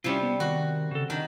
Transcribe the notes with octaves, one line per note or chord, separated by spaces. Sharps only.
C3 G3 C#4 E4 F4
B3
D#3 F#4
C#3 A4
D#3 D4